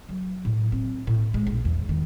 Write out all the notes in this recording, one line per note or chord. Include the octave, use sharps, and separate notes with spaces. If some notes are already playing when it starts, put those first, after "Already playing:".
F#3
A2
C4
A2
G#3
A#1
E2
D#3